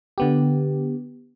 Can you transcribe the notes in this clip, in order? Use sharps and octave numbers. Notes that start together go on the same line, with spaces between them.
D3 B3 G4